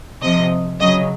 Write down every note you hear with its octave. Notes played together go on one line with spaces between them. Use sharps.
C3 F3 D#5
C#3 F#3 D#5